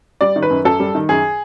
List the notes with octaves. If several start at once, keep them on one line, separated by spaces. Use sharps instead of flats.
G3 D5
D#3
B4
F#2
F#2 A4
G3
D#3
F#2 G#4